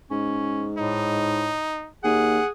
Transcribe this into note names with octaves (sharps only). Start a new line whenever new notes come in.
G#2 C#4
A2 D#4
D#2 G#4 F#5